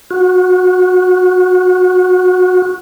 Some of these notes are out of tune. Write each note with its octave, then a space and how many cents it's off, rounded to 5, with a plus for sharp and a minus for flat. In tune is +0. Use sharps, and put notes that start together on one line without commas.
F#4 -20